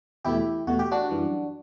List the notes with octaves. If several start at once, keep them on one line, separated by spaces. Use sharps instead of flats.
E2 B2 A3 E4 G4
E2 B2 A3 F#4
G4
D4 F#4
F#2 E3 G3